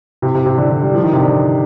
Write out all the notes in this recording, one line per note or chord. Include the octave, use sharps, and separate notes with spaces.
C3
C3
C3
D3
D3
G3
F3
D#3
C3
D3